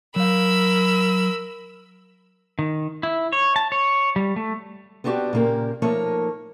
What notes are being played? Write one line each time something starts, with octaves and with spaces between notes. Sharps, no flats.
F#3 A#4 F5 B5 E6
D#3
E4
C#5
A5
C#5
G3
A3
B3 C4 D4 F#4 G4
A#2 C#3 A#3 G4 A#4
F3 A3 A#3 D#4 A#4 C#5